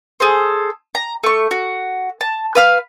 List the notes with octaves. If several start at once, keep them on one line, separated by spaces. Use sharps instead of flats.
G#4 A4 C5
A#5
A3 C#6
F#4
A5
B4 F5 F6